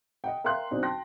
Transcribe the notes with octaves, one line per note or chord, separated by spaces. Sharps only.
D#5 F#5 G5
A#4 E5 F5 G5 C6 F#6
B1 C4 D4 D#4
G5 A5 C6 F#6 A#6